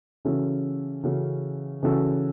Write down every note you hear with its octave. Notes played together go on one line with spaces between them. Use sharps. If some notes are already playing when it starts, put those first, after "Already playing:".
C#3 E3 C#4 F#4 A4
C#3 E3 C#4 F#4 A4
C#3 E3 C#4 F#4 A4